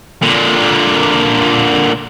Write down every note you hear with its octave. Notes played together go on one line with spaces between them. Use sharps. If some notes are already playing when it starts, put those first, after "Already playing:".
A#2 D3